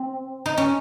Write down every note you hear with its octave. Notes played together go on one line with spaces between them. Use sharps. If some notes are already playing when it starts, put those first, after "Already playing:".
Already playing: C4
D#4
C#4